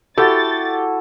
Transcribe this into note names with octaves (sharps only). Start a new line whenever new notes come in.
E4 F#4 G4 A4 A6